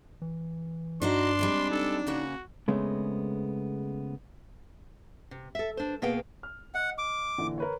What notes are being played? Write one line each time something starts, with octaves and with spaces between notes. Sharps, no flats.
E3
G2 D4 D#4 F#4 C5 C6
G3 G#3 C4
D#4 A4
C#3 A#3 C#4 F#4
C#3 G#3 A3 B3 C4
C3
A4 E5
D4 C5
B2 A#3 B3 G#4 F5 G5
F6
D#5 F#5
D6
A#2 D3 E3
A#4 B4 C#5